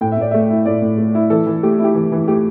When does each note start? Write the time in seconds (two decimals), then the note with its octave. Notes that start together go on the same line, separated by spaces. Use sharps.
0.01 A2 G5
0.12 E5
0.17 A2 D5
0.31 A3 E5
0.50 E4
0.66 A2 D5
0.82 A2
0.98 A3
1.15 E4
1.30 E3 A4
1.47 E3
1.63 A3 G4
1.79 E4
1.84 G4
1.95 E3
2.12 E3
2.27 A3 G4